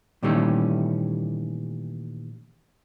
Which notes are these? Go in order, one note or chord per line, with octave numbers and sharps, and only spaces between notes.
A#2 D#3 E3 G3 A3 C#4